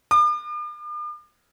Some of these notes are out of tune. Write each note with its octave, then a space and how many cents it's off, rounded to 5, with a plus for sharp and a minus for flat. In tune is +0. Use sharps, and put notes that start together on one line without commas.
D6 +45